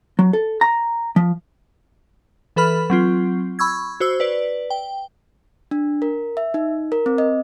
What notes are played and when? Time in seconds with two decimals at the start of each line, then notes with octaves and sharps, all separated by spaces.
0.19 F#3
0.33 A4
0.61 A#5
1.16 F3
2.56 E3 A4 B4 B5 F6
2.90 F#3 C4 F4
3.59 B5 C#6 E6 G#6
4.00 F#4 C5 E6
4.20 B4 D5
4.70 G5
5.71 D4
6.02 A#4
6.37 E5
6.54 D#4
6.92 A#4
7.06 C4
7.18 D#5